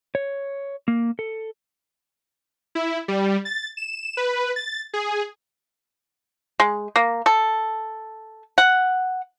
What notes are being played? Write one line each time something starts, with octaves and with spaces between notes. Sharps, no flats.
C#5
A#3
A4
E4
G3
A6
E7
B4
A6
G#4
G#3
A#3
A4
F#5